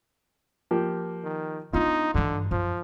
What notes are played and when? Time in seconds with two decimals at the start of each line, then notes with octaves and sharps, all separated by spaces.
0.71 F3 A#3 G4
1.24 D#3
1.73 B3 D4 D#4 F4
2.14 G2 D3 E3
2.51 F#2 F3